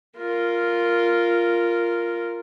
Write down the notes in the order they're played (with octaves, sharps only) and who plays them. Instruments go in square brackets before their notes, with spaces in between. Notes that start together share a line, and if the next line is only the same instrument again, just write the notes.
[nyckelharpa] F4 A#4